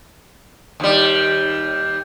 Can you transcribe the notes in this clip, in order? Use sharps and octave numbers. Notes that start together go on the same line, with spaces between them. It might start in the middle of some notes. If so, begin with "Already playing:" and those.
D#2 G3